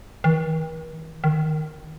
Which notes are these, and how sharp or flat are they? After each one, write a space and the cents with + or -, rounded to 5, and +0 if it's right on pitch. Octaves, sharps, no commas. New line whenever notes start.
D#3 +45
D#3 -5